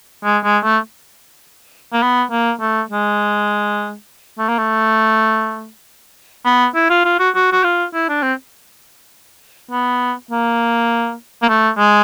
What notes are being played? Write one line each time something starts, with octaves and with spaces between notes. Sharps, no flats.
G#3
G#3
A3
A#3
B3
A#3
A3
G#3
A3
A#3
A3
B3
E4
F4
F4
F#4
F#4
F#4
F4
E4
D4
C4
B3
A#3
A#3
A3
G#3